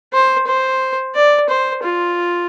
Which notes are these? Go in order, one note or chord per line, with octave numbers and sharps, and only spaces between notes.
C5
C5
D5
C5
F4